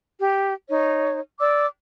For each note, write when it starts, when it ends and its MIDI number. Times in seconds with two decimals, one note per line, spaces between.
0.19 0.54 67
0.69 1.19 63
0.69 1.19 73
1.39 1.66 74
1.39 1.66 86
1.39 1.66 88